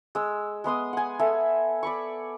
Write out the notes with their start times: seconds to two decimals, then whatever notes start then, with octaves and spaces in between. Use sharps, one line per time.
0.15 G#3 E6
0.64 G#3 B3 C6 D#6
0.93 F#5 G#5
1.19 A4 E5 G#5
1.83 D5 B5 C#6